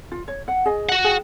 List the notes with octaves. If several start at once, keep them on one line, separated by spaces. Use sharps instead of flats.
F4
C#5
F#5
G#4 D#5
F#4 F#5
G#4 G5